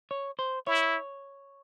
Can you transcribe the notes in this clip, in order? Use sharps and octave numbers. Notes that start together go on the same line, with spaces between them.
C#5
C5
E4 C#5